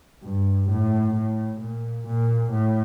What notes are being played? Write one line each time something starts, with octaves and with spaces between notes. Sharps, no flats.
G2
A2
A2
A#2
A#2
A2